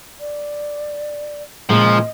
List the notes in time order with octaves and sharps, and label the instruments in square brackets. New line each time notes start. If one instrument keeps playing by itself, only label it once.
[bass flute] D5
[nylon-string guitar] A#2 C#3 G#3 [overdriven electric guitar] F3 [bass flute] D#5